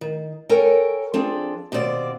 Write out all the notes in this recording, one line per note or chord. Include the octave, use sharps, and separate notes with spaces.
D#3
A4 A#4 C#5 G5 G#5
F3 C4 D4 G#4 A4
D#2 B2 C4 G4 D5